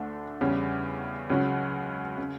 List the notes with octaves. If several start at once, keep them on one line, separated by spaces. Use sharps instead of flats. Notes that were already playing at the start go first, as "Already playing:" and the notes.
Already playing: D2 D3 A3 D4
E2 C#3 G3 C#4
C#2 C#3 F#3 C#4 F#4
C#3